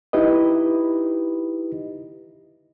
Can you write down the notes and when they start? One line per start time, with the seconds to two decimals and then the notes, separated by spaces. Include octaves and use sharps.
0.13 D#4 E4 G4 B4 D#5